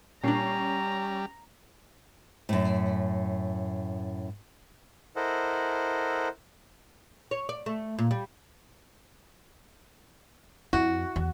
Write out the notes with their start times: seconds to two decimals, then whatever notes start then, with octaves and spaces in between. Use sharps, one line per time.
0.24 A#2 G3 C#4 D4 A#5 C7
2.49 F#2 A2
5.16 E4 A4 A#4 C5 D#5 F#5
7.31 C#5
7.49 D5
7.66 A3
7.98 A#2
8.11 G3
10.73 F2 E4 F#4
11.16 E2